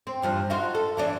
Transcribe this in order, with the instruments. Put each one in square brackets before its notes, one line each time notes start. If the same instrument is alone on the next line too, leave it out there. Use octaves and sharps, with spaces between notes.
[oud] C4
E2 G2 F3
D#4 F4 F#4
A4
E3 F#3 D4